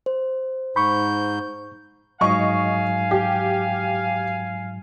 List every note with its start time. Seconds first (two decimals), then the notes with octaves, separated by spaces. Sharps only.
0.06 C5
0.76 G#2 B5 C#6 G6
2.21 G#2 F#3 D#5 F5 G#5 C#6
3.11 G4